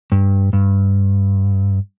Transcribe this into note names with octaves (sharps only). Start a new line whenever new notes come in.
G2
G2